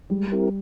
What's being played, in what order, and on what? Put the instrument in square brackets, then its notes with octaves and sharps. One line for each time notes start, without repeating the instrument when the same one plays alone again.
[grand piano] G3 [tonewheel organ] G#3
[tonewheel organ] C4 E4 G4 A#4